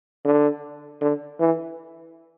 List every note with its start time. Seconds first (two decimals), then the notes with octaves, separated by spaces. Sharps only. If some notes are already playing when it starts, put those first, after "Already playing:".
0.24 D3
1.01 D3
1.40 E3